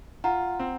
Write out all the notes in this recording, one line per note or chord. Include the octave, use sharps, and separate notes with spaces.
F4 F#5 A#5
C4